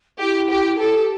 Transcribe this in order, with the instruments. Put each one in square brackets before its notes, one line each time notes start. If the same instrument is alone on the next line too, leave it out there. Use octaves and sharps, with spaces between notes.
[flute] E4 [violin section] G4
[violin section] G4
[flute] E4 [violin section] A4
[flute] G4